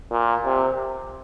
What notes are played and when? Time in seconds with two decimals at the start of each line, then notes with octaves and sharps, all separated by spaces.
0.11 A#2
0.45 C3